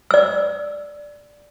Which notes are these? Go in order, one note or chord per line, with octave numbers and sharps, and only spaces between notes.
D5 E6